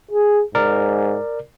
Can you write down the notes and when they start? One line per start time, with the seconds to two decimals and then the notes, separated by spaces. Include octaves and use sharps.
0.11 G#4
0.55 G#2 A#4 D5